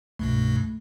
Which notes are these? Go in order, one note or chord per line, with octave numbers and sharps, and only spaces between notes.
C2 G2 B2 A3